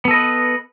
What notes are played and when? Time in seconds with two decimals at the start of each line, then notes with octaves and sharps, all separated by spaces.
0.05 B3
0.08 A4
0.11 D#5
0.14 B4